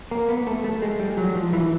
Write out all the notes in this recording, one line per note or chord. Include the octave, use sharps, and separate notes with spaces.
A#3
B3
A3
A3
G#3
G3
F#3
F3
E3